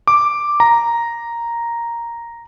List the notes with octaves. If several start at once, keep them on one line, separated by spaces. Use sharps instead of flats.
D6
A#5